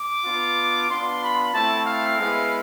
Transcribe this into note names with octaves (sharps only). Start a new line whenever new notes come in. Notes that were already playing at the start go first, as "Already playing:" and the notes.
Already playing: D6
B3 D4 F4
B3 D4 F4 C6
B5
A3 C4 E4 A5
F5
G#3 B3 E4